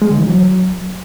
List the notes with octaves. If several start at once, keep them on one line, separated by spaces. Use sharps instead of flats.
G#3
D3
E3
F#3